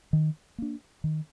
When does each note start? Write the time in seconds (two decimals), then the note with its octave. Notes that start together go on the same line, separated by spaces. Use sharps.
0.13 D#3
0.58 A#3 D4
1.04 D#3